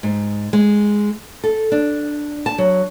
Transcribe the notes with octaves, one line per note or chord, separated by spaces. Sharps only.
G#2
G#3
A4
D4
A5
F#3